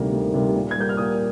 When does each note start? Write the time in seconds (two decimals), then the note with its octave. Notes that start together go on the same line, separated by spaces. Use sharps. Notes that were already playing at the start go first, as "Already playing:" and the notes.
Already playing: D2 C3 D#3 G3 A#3
0.13 D2
0.34 C3 D#3 G3 A#3
0.55 A#2
0.71 G#6
0.77 G3 A#3 G6
0.89 F6
0.97 A#2 D#6